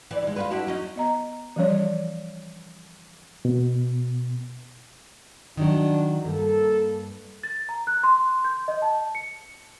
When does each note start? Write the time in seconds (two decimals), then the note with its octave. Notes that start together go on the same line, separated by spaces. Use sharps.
0.11 E3 D5
0.22 D#2 G#3
0.36 F4 F#4 B4
0.51 D4 E4 F#4
0.67 F#3 C#4 D#4
0.96 B3 D#5 A#5
1.56 E3 F3 G3 C#4 C#5 D5
3.45 B2
5.57 D#3 E3 F#3 D4
6.25 G2 A#3 A4
7.43 A6
7.69 A#5
7.87 F#6
8.03 C6
8.45 G6
8.68 D#5
8.82 A5
9.15 C#7